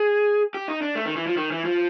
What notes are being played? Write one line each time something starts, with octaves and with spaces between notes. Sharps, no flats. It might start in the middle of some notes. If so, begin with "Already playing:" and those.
Already playing: G#4
G4
D#4
D4
A3
D#3
E3
F3
D#3
E3
F3